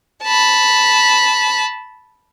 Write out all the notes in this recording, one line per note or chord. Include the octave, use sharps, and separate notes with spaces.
A5 B5